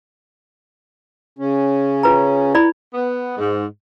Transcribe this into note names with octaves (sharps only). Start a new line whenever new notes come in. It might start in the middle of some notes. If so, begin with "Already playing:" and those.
C#3 C#4
F4 B4 A#5
E4 D5 B5
B3
G#2